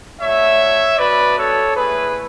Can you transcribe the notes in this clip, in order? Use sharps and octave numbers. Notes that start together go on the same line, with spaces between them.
A3 D4 F#4 C#5 E5
B3 D4 F#4 B4 D5
A4 C#5
A3 E4 G#4 B4